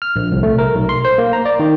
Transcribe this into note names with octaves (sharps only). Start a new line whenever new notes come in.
F6
A#1
C2
A3
A#4
B1
C6
C5
A#3
A#5
D5
D#3